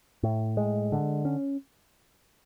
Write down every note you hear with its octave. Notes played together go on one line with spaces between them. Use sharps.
A2
G#3
D3
C#4